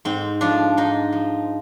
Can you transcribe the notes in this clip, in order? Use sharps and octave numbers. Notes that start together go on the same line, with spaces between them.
G#2 C4
F3 D4
G#2 D#4
F3